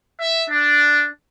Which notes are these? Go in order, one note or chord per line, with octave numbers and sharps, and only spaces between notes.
E5
D4